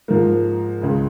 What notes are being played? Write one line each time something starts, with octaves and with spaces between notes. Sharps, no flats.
G#2 F3 A#3
C#2 C#3 G#3